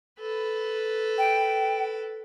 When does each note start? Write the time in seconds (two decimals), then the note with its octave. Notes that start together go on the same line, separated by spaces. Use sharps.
0.20 A4 B4
1.18 G5